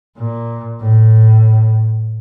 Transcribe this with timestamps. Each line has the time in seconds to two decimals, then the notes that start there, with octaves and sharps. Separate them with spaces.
0.18 A#2
0.81 A2